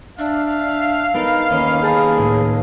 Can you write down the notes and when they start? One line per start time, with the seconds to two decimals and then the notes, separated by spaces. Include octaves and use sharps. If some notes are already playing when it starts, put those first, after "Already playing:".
0.19 D4 E5 F5
1.14 B3 D#4 A4 A#4
1.50 D#2 A#3 C#4 D#5 B5
1.82 G#4 G5 A5 B5
2.17 C#2 A2 D#3